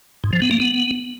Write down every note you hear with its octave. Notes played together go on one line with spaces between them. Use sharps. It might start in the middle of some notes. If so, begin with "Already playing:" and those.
G#2
F3
B3
A#3
B3